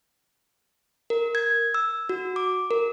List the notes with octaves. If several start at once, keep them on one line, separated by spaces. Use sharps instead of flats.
A#4
G#6
E6
F#4
D6
A#4